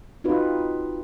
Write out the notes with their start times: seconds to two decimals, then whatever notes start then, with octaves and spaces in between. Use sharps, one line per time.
0.24 C4 D#4 F4 F#4 B4